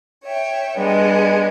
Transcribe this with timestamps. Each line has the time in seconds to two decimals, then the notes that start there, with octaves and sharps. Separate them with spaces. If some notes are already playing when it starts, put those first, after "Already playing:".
0.24 C#5 E5 G5
0.77 G3 G#3 B3 D4